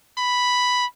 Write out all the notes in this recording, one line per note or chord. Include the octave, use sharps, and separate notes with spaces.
B5